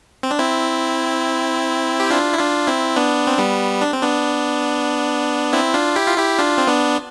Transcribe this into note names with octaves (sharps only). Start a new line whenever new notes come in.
C4
D4
C4 E4
G4
D4 F4
E4
D4 F4
C4 E4
B3 D4
C4
G3 B3
D4
C4
B3 D4
C4 E4
D4 F4
E4 G4
F4
E4 G4
D4 F4
C4
B3 D4